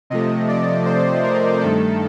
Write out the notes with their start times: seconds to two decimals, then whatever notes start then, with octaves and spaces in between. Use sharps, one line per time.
0.10 C3 F3 A3 D#5
0.48 D5
0.86 C5
1.23 A#4
1.60 G2 D#3 A3 A4